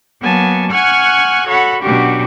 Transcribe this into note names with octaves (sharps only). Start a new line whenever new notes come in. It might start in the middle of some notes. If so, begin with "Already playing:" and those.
F#3 A#3 B3 G#5 A5
F#5 G#5 C#6 F6 F#6 G#6
F#4 A4 C#5 F#5 B5
B2 F#3 C#4 D4 F#4 G4